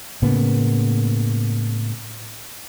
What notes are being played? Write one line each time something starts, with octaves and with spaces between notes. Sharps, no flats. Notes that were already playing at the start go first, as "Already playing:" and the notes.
A2 C#3 A#3 B3